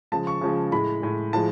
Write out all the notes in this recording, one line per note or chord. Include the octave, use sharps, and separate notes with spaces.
C#3 F3 G#3 A5
C#6
C#3 F3 G#3
A2 G#3 B5
A2 G#3
A2 F3 G#3 A5